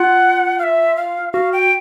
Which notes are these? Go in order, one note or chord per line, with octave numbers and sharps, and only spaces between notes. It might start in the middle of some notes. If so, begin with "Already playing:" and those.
Already playing: F4 F#5
F5
E5
F5
F#4 F5
G5